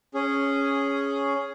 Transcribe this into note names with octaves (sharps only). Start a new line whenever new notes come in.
C#4 G#4